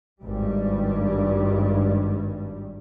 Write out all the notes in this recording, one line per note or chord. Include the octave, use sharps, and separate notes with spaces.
G#1 G2 G3